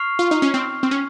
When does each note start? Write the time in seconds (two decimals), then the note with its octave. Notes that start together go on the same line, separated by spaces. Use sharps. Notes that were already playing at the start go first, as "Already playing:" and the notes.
Already playing: C#6 F6 C7 F7
0.19 F4
0.31 D#4
0.42 C#4
0.54 C4
0.83 C4
0.91 C#4